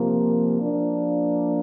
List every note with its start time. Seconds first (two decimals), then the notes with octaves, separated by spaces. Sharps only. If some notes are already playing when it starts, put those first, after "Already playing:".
Already playing: C3 F3 A#3
0.61 F3 A#3 D4